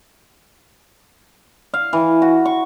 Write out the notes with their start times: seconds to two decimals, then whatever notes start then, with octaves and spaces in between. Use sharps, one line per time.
1.74 F5
1.93 E3
2.22 F#4
2.45 C#6